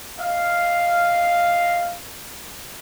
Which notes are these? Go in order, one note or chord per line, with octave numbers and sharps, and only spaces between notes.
D#5 F5